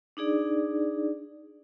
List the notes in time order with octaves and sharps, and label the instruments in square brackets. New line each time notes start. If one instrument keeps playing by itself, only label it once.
[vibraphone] D4 D#4 G#4 D5